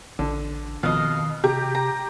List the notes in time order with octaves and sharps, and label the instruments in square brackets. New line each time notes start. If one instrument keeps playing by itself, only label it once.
[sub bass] A1 [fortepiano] D3
[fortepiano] F2 B2 [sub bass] D#3 [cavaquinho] D#5 F5
[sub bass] C3 [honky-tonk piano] G4 [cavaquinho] A#5
[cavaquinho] A#5